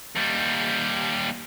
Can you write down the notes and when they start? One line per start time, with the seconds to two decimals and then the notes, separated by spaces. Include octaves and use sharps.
0.16 D#2 G3